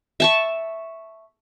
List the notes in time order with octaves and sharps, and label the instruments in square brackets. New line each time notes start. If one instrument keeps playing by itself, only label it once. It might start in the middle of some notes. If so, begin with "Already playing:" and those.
[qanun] E5 A5 C#6